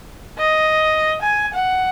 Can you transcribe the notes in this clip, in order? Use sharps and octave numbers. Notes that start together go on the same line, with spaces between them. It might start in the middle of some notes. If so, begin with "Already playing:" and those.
D#5
G#5
F#5